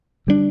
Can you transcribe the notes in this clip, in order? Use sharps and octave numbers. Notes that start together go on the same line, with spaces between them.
D3 G3 B3 D4